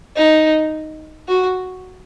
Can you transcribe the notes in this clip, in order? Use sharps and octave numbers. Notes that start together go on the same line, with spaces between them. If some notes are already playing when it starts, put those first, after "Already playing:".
D#4
F#4